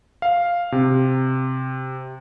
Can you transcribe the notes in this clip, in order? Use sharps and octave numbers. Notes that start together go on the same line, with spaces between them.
F5
C3